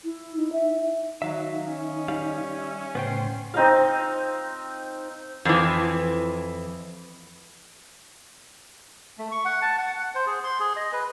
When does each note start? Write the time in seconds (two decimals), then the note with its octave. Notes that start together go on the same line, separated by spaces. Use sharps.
0.05 E4
0.37 D#4
0.53 E5
1.22 D#3 F#3 D#4 E5 F5
1.68 C#4
2.08 G3 F5
2.58 E5
2.95 A2 C#3 B3 C5 G5 C6
3.54 C4 D#4 D#5 F5
5.45 F2 E3
9.18 A3
9.32 C#6
9.45 F#5
9.62 A5
9.78 F#5
9.99 F#5
10.15 C5
10.27 G#4
10.44 C6
10.60 G#4
10.76 D#5
10.93 B4